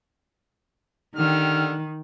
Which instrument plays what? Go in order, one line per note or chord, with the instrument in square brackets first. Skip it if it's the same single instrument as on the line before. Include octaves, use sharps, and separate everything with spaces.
[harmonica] D3 G4 F6 [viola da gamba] D#3